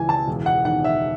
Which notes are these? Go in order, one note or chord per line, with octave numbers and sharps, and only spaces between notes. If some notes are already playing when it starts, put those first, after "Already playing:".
Already playing: C#2 E3 G#5
A5
E1
F#5
D#3 F#5
E5